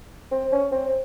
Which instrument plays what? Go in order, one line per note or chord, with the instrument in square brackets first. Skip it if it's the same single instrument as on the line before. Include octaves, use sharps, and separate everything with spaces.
[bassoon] C4
C#4
C4